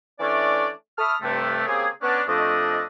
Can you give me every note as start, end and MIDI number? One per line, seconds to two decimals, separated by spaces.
0.20 0.68 52
0.20 0.68 57
0.20 0.68 61
0.20 0.68 62
0.20 0.68 74
0.99 1.15 76
0.99 1.15 81
0.99 1.15 83
0.99 1.15 85
0.99 1.15 87
0.99 1.15 89
1.22 1.64 43
1.22 1.64 48
1.22 1.64 57
1.66 1.88 49
1.66 1.88 58
1.66 1.88 60
1.66 1.88 67
1.66 1.88 68
2.02 2.22 59
2.02 2.22 61
2.02 2.22 62
2.27 2.82 41
2.27 2.82 57
2.27 2.82 62
2.27 2.82 75